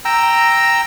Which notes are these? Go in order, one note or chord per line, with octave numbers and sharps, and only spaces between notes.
G5 A#5 E6